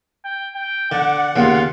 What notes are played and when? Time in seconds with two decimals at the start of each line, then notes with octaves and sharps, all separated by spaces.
0.25 G5
0.55 G5
0.92 D3 D5 F#5
1.36 D#2 C#3 F4